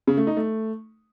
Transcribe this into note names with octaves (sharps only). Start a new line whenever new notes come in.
C#3
A3
D#4
A3